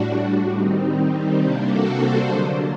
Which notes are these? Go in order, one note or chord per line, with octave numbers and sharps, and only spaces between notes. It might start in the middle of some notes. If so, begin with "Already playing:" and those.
Already playing: A2 G3 D4 F#4
D#3 G3 C4 D#4
C3 G3 A#3 D4 G4
F#4 A4
A4 C5
D3 F#3 A#3 D4 C5 D#5